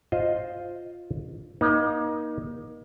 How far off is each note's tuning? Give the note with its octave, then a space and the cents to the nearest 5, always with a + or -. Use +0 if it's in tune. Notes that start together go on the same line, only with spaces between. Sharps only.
F4 +0 C5 +0 D#5 +0
A#3 +30 D#4 +0